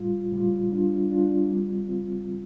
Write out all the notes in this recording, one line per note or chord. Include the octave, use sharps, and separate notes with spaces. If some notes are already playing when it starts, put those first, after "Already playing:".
Already playing: A2 G3 F4
A2 G3 F4
G3 D4 F4
G3 D4 F4
G3 C4 F4
G3 C4 F4